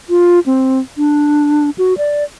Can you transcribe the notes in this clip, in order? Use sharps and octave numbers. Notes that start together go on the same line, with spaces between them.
F4
C4
D4
F#4
D5